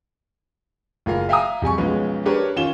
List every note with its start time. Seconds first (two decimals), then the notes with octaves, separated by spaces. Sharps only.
1.06 F#1 F4 A#4 F5
1.29 E5 F5 G5 G#5 A#5 D#6
1.62 F2 G3 G#5 C#6
1.78 B1 F3 G#3 B3 C#4
2.25 D4 G4 A#4 B4 C#5
2.56 D#3 C#4 F4 E7 G7